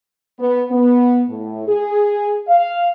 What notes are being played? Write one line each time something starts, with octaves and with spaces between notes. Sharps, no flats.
B3
B3
A2
G#4
F5